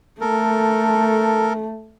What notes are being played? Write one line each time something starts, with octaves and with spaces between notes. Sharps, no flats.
A3 A4 A#4